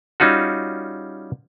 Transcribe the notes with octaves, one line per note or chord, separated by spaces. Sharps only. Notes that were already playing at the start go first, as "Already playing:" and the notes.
G3 C#4 D#4 F4 F#4